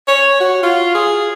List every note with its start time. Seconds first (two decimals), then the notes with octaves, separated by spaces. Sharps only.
0.08 C#5
0.41 F#4
0.63 F4
0.95 G#4